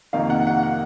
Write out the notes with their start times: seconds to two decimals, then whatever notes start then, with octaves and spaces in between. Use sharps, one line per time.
0.13 F2 C3 D#3 A#3 D#4 F5
0.30 F#5
0.47 F#5
0.63 F#5